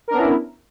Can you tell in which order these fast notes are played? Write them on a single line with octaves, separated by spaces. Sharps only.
A#4 D4 B3 C#4 E4